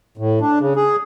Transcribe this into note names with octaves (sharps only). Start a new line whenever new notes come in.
A2
D4
C#3
G#4